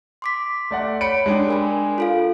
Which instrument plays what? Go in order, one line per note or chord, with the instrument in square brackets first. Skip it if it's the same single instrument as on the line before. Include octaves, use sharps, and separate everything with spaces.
[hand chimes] C6 D6 B6
[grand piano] A3 D5 F#5
[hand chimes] C#5 [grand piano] B5 C#7 D7
[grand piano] G#3 D4 G4
[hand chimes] A#4 G#5 B5
F4 A4 F5